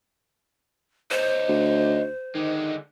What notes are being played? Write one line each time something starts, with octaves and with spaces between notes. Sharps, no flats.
D#4 C5 C#5
D2
D3 D#3 G#3